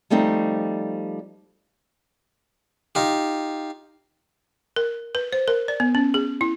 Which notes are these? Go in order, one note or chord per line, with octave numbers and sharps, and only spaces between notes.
F3 G3 A3 C4 D#4
D#4 F4 G4
A#4
B4
C5
A#4
D5
B3
C#4
G#4
E4